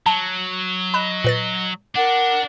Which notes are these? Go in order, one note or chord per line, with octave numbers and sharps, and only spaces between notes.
F#3 A5
D#5 B5 F#6 E7
A#2 B4 A6
D4 A#4 F#5 D6